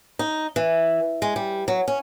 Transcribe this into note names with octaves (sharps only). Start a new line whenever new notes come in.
D#4
E3
G#3
G3
F#3
C#4